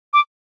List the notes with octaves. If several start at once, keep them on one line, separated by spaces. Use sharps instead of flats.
D6